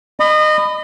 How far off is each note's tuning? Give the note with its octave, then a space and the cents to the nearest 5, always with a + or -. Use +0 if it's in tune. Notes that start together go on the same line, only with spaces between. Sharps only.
D#5 -25 B5 +20